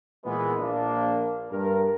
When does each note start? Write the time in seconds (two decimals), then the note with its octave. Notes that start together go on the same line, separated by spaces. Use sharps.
0.25 A#2 E3 G#3 B3
0.59 A#1 A#3 D4
1.50 G2 A#4